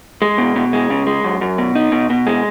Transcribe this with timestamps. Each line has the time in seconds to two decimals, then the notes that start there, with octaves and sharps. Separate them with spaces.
0.22 G#3
0.38 B2
0.56 B2
0.73 G#3
0.90 C#3
1.07 G#3
1.24 F#2
1.41 F#2
1.58 B2
1.75 D#4
1.92 B2
2.10 B2
2.27 G#3